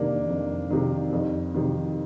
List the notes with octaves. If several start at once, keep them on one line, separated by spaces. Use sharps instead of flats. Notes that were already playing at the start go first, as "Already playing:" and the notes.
Already playing: F2 C3 D#3 A#3 D4
F2
C3 D#3
F2
C3 D#3